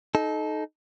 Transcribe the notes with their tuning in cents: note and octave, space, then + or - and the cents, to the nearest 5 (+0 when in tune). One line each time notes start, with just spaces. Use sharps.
D#4 +0 A4 -30